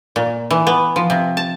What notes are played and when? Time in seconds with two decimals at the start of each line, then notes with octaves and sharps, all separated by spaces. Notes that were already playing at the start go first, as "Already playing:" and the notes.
0.16 A#2
0.51 E3
0.67 B3
0.96 F3
1.10 C3
1.37 A5